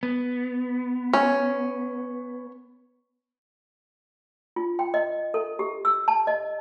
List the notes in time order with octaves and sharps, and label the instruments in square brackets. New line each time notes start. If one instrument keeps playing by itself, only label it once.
[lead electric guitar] B3
[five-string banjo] C#4
[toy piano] F4
G5
D#5
A4
G4
E6
A5
D#5